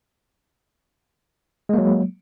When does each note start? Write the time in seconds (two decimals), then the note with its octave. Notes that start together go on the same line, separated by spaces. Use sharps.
1.69 G#3
1.74 A#3
1.78 F#3